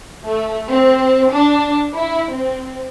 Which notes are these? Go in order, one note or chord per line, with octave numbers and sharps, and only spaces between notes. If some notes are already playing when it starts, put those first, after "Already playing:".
A3
C4
D4
E4
C4